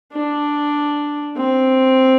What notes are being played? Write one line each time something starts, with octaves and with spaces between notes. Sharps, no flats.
D4
C4